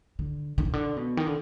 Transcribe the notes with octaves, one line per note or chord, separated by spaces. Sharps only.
D3
D3
B2
D3
B2
D#3
D3